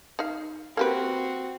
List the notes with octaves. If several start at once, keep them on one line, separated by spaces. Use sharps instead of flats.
D#4 F5
A#3 C4 F#4 G4 B4